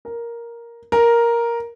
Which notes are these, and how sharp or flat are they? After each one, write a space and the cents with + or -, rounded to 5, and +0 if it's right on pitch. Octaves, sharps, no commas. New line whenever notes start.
A#4 +5
A#4 +5